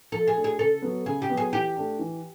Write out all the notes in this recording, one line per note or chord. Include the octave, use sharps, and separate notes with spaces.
F3 A4
G#4
A3 D4 F#4
G#4
C#3 A4
F#3 B3
C#3 G#4
G4
F#3 B3
G#4
E3 G4
A3 D4
E3